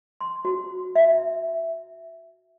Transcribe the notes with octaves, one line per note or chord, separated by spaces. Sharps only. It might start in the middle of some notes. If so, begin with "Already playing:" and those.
C6
F#4
E5